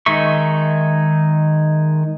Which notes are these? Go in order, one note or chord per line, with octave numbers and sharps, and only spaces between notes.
D#3 G#3 D#4 E5 C#6